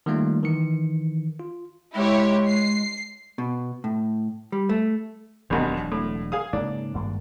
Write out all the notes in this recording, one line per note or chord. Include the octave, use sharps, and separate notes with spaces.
D#3 G3 A3 A#3 F4
D#3 E3 C#7
F4
G#3 E4 G4 C#5
C7
B2
A2
G3
A3
E1 A#1 D#2 B2 F#3 D4
A2
G#4 F5 D#6
G#2 C#3 A#3 D4
G#1 G2 A#3